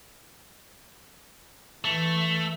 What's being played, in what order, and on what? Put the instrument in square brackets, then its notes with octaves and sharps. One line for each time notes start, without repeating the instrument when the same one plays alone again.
[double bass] E3 [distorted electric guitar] A3